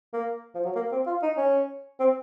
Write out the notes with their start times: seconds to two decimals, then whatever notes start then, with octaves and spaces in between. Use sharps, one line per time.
0.13 A#3
0.55 F3
0.65 F#3
0.75 A#3
0.92 C4
1.06 F4
1.23 D#4
1.37 C#4
2.00 C4